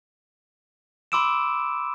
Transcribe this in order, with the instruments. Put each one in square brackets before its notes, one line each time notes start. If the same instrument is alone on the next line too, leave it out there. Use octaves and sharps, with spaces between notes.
[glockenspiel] B5 C6 D6 E6 D7 E7